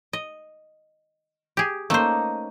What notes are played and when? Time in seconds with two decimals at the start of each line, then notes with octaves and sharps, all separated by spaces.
0.13 D#5
1.57 G4 G#4
1.90 A3 A#3 C#4 D#4 C5